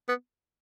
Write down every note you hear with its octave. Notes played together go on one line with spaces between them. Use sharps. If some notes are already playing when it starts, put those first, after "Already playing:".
B3